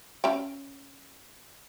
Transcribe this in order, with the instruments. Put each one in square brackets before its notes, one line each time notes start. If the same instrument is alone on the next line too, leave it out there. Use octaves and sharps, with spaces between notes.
[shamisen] C#4 E5 G5